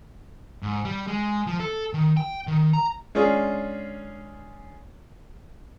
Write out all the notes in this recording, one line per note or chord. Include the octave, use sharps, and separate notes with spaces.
G#2
G3
G#3
F3
A4
D#3
G5
D#3
A#5
G#3 C#4 D4 F4 G#4